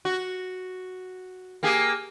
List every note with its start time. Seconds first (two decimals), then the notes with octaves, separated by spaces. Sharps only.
0.05 F#4
1.63 A#3 G4 G#4